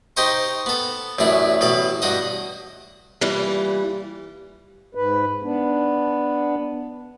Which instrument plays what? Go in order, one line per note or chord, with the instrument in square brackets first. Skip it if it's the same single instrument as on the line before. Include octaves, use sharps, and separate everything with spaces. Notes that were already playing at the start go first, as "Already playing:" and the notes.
[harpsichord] D#4 G4 C5 D#5 C#6
B3 A4
A1 F#2 D4 E4
A1 B2 A4 B5
G2 F#4 D#5
[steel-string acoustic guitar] A#2 E3 G3
[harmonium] G#2 B4
B3 D4